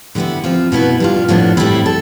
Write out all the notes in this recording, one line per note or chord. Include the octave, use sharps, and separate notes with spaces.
D3 G3 B3 E4
F3 C4 F4
B2 B3 E4 B4
G3 D4 F4
A2 F3 B3 D4
A2 G3 C4 E4
A4